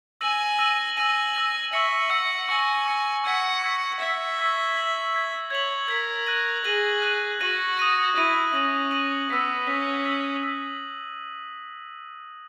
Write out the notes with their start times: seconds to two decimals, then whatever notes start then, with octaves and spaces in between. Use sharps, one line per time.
0.21 G#5 E6 A#6 D#7 F#7
0.59 E6 A#6 D#7 F#7
0.97 G#5 E6 A#6 D#7 F#7
1.35 E6 A#6 D#7 F#7
1.73 E5 C#6 E6 A#6 C#7 F#7
2.10 F#5 C#6 E6 A#6 C#7 F#7
2.48 G#5 C#6 E6 A#6 C#7 F#7
2.86 C#6 E6 A#6 C#7 F#7
3.24 F#5 C#6 E6 G#6 B6
3.62 C#6 E6 G#6 B6
3.99 E5 C#6 E6 G#6 B6
4.37 C#6 E6 G#6 B6
4.75 G#6 B6 F#7
5.14 G#6 B6 F#7
5.50 C#5 G#6 B6 F#7
5.88 A#4 G#6 B6 F#7
6.27 F#6 A#6 D#7 F#7
6.64 G#4 F#6 A#6 D#7 F#7
7.02 F#6 A#6 D#7 F#7
7.40 F#4 F#6 A#6 D#7 F#7
7.77 D#6 A#6 D#7 F#7
8.16 E4 D#6 A#6 D#7 F#7
8.53 C#4 D#6 A#6 D#7 F#7
8.91 D#6 A#6 D#7 F#7
9.29 B3 E6 B6 F#7
9.67 C#4 E6 B6 F#7
10.04 E6 B6 F#7
10.42 E6 B6 F#7